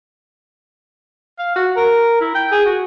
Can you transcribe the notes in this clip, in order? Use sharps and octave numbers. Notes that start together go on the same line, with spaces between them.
F5
F#4
A#4
E4
G5
G#4
F#4